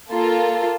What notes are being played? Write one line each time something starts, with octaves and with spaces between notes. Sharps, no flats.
A#3 F4 A4